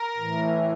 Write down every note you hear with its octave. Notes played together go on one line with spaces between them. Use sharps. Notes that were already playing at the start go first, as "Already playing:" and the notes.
Already playing: A#4
A2 E3